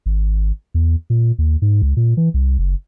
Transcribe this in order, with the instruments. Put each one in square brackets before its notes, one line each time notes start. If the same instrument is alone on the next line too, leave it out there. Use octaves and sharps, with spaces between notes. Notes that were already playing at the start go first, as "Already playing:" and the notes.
[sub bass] G#1
E2
A#2
D#2
G#2
C#2
A#2
E3
C2
F#1